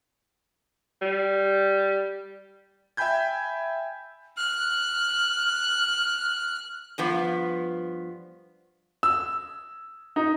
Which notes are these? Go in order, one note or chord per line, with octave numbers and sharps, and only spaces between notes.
G3
E5 G5 G#5 B5 G6 G#6
F6 F#6
G2 F3 B3
E6
D#4